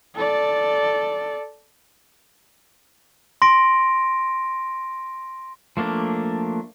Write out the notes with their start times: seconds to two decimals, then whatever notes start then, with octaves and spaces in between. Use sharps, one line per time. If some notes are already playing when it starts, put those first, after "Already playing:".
0.15 A4 D5
3.42 C6 A#6 D7
5.77 F3 A3 A#3 D4